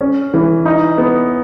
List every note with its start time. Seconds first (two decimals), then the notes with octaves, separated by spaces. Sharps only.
0.01 C#4
0.34 E3
0.65 D#4
0.98 B3